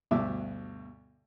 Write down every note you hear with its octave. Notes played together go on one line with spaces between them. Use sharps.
D2 G2 B2 E5 D6 E6